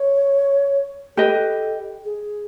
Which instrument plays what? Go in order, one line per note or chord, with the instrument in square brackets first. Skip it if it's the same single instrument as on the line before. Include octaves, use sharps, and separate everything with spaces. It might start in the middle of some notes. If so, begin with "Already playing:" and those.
Already playing: [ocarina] C#5
[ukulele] G4 B4 D#5 [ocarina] A4
[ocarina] G#4